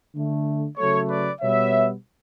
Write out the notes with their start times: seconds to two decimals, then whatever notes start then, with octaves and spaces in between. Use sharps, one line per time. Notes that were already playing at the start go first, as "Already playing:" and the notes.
0.14 D3 A3
0.77 C#3 F#3 A3 A4 C#5
1.09 B4 D5
1.41 B2 G3 B3 C#5 E5